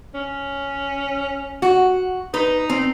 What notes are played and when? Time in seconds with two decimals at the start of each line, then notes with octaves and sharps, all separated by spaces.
0.14 C#4
1.62 F#4
2.34 D#4 B4
2.70 C4